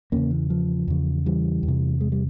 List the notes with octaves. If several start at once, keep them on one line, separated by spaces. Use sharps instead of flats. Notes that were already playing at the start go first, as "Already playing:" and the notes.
E2 C#3 A#3 C#4
E3
F3
E2 C#3
E3 G3
E2
C3
G#3
G3